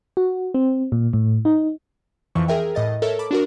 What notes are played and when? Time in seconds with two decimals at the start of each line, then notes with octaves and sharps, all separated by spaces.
0.17 F#4
0.54 C4
0.92 A#2
1.13 A2
1.45 D#4
2.35 F2 E3 C#6
2.48 G#4 A#4 E5 G5
2.75 A2 D#5 A6
3.02 A4 A#4 C#5 E5
3.19 A5 B5 D6
3.31 D4 F#4 A#4